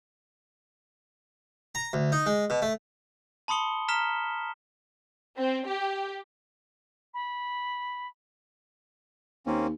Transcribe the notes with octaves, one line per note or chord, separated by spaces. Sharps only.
A#5
D2
D#4
G#3
B2
A3
A5 B5 C6 D#6 C#7 G7
A#5 F6 B6 E7 G7
C4
G4
B5
D#2 A#3 C4 C#4